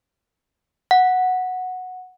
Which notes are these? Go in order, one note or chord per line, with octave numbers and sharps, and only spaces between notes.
F#5